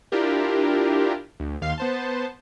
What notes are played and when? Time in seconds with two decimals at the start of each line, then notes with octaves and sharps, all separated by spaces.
0.12 D4 E4 F4 G4 A#4
1.40 D2
1.62 D#2 F5 C6
1.78 B3 C5 A5